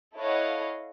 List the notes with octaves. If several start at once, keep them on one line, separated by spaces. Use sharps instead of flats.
E4 A4 C#5 D#5 F5 F#5